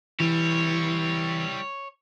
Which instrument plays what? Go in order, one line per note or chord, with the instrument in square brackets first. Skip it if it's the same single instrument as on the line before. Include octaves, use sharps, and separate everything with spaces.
[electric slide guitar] E3 [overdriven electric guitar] G3 E4 [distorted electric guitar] C#5